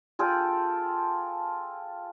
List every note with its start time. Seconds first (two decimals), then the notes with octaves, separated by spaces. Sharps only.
0.19 F4 G#4 A4 G5